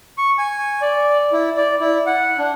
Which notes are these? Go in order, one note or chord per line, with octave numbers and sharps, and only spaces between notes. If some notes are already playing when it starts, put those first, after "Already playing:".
C#6
G#5
D5
E4
D5
E4
F#5
D4